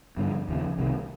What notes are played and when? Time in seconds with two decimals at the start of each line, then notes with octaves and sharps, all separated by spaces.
0.17 G2 D3 F3
0.48 D#2 C#3 F3
0.79 C2 C3 D#3